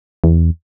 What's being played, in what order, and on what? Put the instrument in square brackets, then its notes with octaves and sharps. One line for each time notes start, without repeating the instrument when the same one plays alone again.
[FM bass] E2